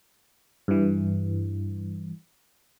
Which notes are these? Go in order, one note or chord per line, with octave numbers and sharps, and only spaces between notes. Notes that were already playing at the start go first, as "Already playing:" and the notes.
G2 E3